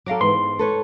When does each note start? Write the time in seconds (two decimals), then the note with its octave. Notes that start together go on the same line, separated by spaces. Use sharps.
0.06 F#3 A4 F5 A#5 D6
0.21 G#2 E3 B3 C6
0.59 A4 B4 C#5